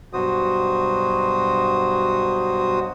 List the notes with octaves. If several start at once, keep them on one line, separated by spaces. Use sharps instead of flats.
G2 B2 F#3 F#4 C5 D#6